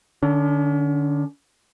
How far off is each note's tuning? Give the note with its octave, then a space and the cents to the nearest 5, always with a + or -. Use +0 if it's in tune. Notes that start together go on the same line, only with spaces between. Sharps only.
D3 +25 C#4 +45